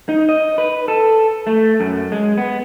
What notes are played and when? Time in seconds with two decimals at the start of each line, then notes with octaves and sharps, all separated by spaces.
0.09 D#4
0.29 D#5
0.58 B4
0.88 A4
1.47 A3
1.80 F#2
2.12 G#3
2.38 B3